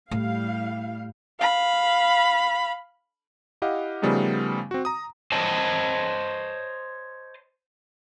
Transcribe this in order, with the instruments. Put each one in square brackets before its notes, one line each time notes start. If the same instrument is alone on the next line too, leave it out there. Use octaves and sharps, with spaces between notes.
[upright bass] A2 [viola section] G3 E4 F5
[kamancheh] F5 B5
[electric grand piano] E4 G4 D#5 F5 F#5
C#3 F3 G3 A3 B3 D#4
C4 F#4
A#5 D#6
[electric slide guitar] C5 C#5 D#5 A5